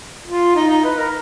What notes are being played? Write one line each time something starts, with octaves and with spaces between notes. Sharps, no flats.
F4
D#4
D#4
B4
A#4